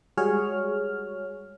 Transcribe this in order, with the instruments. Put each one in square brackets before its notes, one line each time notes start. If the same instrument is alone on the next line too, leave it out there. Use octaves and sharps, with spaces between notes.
[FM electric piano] G3 G#3 F#4 G#4 C#5 F6